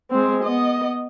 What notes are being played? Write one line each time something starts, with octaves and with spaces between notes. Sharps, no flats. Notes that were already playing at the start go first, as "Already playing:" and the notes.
G#3 C4
B3 D#5